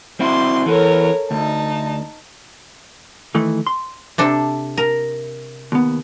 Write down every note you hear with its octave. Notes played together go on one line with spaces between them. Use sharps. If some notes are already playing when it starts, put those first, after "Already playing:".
C4 E4 F#4 C6 D6
E3 B3 A4 A#4 C#5
D2 D#4 A5
D#3 E3 A3
C6
C3 D4 A4
A#4
D#2 B3